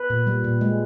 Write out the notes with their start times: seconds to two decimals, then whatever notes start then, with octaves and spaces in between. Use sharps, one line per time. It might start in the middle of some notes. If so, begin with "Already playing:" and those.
Already playing: B4
0.10 A#2
0.27 G3
0.44 A#2
0.61 G#3